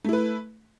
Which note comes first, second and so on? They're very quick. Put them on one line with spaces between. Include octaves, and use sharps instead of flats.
A3 E4 B4